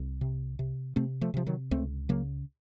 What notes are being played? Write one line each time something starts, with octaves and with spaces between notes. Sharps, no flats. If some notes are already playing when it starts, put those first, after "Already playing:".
Already playing: C2
C3
C3
C3 A3 C4
F3 A3
C3 F3
D#3 F#3
C#2 A3 C4
C#3 F#3 A#3